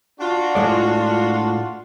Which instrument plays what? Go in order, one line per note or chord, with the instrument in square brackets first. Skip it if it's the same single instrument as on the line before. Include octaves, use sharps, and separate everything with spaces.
[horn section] D4 F4 F#4
[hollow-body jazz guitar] A2 G#3 D5